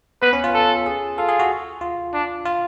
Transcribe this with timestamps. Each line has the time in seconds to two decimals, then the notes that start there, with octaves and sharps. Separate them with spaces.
0.22 B3 B4
0.33 C#4
0.44 F4
0.54 A4
0.86 G#4
1.18 F4 A4
1.29 G#4
1.39 F#4
1.81 F4
2.14 D4
2.45 F4